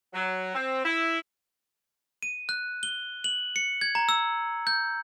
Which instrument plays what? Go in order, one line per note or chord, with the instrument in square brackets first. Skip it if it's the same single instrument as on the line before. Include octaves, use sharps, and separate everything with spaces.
[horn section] F#3
C4
E4
[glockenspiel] D#7
F#6
G7
F#7
C#7
G#6
A#5
E6
G6